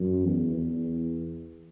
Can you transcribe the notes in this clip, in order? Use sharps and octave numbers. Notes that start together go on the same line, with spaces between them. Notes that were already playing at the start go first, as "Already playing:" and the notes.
Already playing: F#2
E2
E2